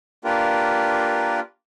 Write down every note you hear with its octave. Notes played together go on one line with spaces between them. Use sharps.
A#3 D4 F4 G4 A#4 B4